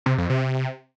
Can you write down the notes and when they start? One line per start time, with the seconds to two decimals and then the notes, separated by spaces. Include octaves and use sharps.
0.06 C3
0.18 F2
0.30 C3